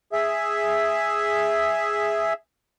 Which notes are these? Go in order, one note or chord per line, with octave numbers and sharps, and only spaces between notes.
G#4 E5